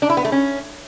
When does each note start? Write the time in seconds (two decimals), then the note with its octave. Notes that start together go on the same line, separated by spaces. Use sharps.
0.02 D4
0.10 E4
0.17 B3
0.25 A3
0.32 C#4